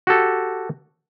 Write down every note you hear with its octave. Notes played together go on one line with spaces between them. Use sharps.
F#4 G4 A4